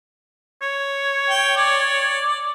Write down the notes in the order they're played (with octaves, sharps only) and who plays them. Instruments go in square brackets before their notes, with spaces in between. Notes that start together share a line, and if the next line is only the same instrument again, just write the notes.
[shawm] C#5
[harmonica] G5
D5